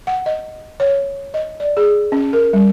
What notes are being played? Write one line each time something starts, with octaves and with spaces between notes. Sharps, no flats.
F#5
D#5
C#5
D#5
D5
G#4
C#4
A#4
G3